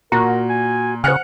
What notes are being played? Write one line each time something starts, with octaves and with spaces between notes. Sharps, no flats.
A#2 F#4 A#4 A#5
G#5
C#3 C5 F#5 G#5 F6 F#6 C#7